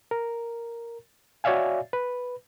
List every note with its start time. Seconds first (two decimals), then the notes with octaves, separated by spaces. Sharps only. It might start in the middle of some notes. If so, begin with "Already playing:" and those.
0.11 A#4
1.44 F#4 C#5 D5 E5 F5 G#5
1.93 B4